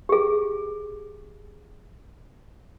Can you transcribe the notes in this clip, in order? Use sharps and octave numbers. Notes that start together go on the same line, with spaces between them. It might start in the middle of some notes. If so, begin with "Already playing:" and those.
G4 G#4